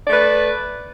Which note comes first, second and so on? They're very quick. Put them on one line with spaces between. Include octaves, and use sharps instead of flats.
D5 A3 B4